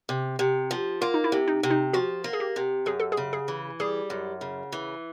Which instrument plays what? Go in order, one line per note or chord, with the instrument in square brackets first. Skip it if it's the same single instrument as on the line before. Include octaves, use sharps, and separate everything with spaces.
[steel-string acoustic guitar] C3
C3
F3
[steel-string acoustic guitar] A#3 [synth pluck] F4
[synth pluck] D#4
E4
[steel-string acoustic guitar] C3
[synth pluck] D#4
[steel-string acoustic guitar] C3
[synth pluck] D#4
[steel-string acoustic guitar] F3 [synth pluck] F#4
[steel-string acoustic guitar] A#3
[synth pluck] G#4
G4
[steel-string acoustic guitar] C3
[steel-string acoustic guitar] F#2 [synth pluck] G#4
[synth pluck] A4
G#4
[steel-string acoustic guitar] C#3
[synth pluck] G#4
[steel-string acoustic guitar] E3
[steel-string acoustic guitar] G3 [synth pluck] G#4
[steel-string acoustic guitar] F#2
C#3
E3